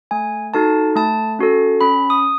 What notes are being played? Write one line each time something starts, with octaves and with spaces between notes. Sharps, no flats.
A3 G#5
D#4 F#4 A4 A5
A3 A5
C#4 F#4 A4
C#4 B5
D#6